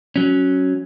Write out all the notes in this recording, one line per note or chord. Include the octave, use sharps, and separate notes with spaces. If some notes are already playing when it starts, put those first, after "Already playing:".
F#3 C#4